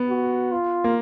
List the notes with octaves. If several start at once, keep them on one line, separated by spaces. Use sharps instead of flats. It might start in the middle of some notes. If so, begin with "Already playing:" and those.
Already playing: B3
F#4
F4
A#3